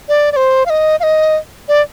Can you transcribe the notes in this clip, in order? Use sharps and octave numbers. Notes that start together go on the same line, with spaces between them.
D5
D5
C5
F5
D#5
F5
D#5
D5